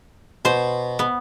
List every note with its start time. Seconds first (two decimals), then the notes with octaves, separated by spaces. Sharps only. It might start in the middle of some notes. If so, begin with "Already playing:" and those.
0.45 B2 C5
0.99 B3